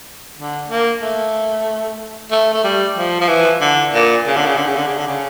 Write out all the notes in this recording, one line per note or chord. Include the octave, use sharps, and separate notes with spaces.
D3
A#3
A3
A3
A3
G3
F3
F3
E3
D3
A#2
C#3
D3
C#3
D3
C#3
D3
C#3
D3
C#3